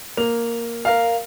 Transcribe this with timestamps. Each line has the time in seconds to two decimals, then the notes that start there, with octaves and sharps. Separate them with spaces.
0.17 A#3 F7
0.85 A#4 F5